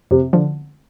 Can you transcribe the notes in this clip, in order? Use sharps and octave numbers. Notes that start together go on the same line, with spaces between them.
F2 C3
D3 F3